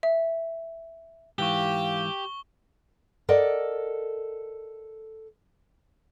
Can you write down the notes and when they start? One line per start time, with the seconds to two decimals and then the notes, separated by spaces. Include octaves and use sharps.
0.03 E5
1.38 G#2 E3 G4 F5 C#6 G7
3.29 A4 A#4 D5 D#5 F#5